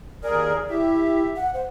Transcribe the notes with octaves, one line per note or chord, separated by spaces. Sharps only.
D#2 G#4 A#4 D5
E4 G4 E5
F#5
C5